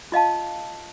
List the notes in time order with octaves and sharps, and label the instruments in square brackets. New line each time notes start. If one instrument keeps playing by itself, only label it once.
[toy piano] F4 D#5 F5 A5